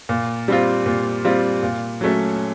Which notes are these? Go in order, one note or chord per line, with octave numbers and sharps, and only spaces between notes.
A#2
G3 C4 F4
A#2
G3 C4 F4
A#2
F#3 A3 C#4